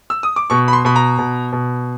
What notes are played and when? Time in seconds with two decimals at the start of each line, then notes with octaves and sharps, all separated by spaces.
0.10 E6
0.23 D#6
0.36 D6
0.50 B2 C#6
0.68 B5
0.73 C6
0.85 B2 B5
0.96 A#5
1.18 B2
1.52 B2